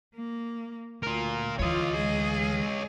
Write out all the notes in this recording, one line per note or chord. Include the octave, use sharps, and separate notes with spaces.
A#3
D2 F4 A#4
D2 E3 F4 C#5 D#5
G#3 G#4